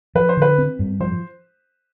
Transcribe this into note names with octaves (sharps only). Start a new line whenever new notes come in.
F3 B4
C5
D3 B4
C4
G2
F3 C5